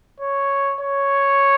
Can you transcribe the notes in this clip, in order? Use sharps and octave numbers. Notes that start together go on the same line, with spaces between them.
C#5
C#5